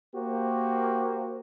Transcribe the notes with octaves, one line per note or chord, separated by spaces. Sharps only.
A#3 F#4 G4 C5